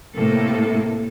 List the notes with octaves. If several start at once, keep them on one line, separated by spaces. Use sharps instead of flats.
A2 C3 A#3 A4